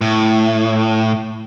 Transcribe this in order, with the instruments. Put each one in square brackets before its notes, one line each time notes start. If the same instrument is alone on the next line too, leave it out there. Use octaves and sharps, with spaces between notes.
[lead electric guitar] A2